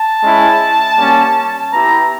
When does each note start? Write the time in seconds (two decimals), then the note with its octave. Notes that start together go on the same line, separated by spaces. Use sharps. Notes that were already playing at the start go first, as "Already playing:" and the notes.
Already playing: A5
0.22 G#3 C#4 E4
0.97 G3 A#3 C#4
1.73 B3 E4 G4 A#5